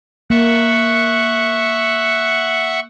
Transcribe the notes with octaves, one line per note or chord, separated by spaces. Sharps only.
A#3 E5 F#5 C#6